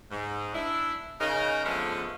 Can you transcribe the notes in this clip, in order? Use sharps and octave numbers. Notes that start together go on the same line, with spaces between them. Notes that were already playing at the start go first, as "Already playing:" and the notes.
G#2
D4 E4
C#3 D#4 A#4
D3 F3 G#3 A3 B3 C#4